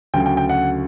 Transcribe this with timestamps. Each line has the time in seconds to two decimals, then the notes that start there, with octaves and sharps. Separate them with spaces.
0.14 D2 C#3 F#3 G5
0.26 G5
0.37 G5
0.49 F#5